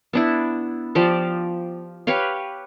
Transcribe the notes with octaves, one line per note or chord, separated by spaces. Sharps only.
B3 D4 E4
F3 G4 D5 F5
G4 B4 C#5 F5